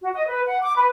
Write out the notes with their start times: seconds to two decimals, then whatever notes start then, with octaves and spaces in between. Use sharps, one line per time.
0.02 F#4
0.14 D#5
0.27 B4
0.46 F#5
0.62 D6
0.76 B4